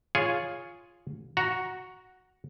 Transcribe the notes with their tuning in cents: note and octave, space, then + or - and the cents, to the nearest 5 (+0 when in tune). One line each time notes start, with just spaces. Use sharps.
F4 +0 G#4 +0 C#5 +5
F#4 +0 A#5 +10